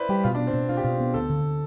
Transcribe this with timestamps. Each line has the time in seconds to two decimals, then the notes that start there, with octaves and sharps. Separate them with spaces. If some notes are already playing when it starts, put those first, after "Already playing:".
Already playing: E4 B4 C5 D5
0.09 G3 G4
0.24 B2 F4
0.35 D4
0.39 B3
0.47 C4
0.54 B2
0.69 D4 F4
0.77 G4
0.83 B2 F4
1.00 B3
1.14 D2 A4
1.30 D3